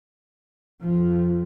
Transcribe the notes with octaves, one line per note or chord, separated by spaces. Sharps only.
F2 F3